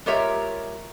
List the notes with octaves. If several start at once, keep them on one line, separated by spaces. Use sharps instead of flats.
G#3 F4 G4 A#4 C#5 E5